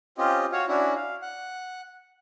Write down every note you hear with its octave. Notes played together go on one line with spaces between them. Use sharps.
C4 C#4 F4 G4 D#5
F#4 C#5 F5
C#4 D4 E4 F#4
F5
F#5